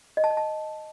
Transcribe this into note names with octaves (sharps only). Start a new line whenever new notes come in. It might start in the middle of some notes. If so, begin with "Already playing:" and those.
D#5
A5
D#5
A5